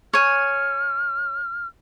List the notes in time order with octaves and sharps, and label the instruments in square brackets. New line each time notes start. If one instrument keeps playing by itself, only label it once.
[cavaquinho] C#5 G#5 [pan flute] F6